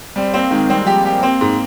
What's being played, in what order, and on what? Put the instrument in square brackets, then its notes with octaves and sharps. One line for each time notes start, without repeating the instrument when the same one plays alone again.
[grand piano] G3 [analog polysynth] C4
[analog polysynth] A#3 [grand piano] C4
[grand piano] D#3 [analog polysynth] G#3
[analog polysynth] G3 [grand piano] C4
[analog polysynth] F3 [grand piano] G4
[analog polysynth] G3
[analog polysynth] A#3 [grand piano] G4
[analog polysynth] A#3 [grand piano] C4
[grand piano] G#2 [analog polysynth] A#3